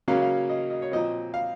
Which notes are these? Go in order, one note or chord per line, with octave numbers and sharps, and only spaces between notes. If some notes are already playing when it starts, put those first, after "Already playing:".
C#3 F#3 A#3 C#4 F5
F5
D#5
D#5
C#5
A#2 F3 C4 D#5
F5